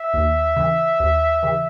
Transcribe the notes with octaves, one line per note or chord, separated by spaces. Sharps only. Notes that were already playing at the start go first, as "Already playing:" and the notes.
Already playing: E5
D#2
C#3 E3
D#2
C#3 E3